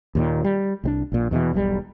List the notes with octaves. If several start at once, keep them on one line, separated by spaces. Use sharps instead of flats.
D#2 A#2 D#3
G3
C2 G3 D4
A#1 A#2
E2 B2 D#3 E3
E1 B1 F#3 G3